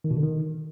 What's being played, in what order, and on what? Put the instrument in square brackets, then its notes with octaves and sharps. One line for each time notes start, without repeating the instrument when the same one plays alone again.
[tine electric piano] D#3
B2
D3
D#3